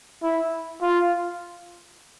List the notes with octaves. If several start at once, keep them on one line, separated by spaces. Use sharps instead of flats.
E4
F4